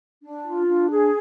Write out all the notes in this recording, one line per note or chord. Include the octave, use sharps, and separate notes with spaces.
D4
F4
D4
G#4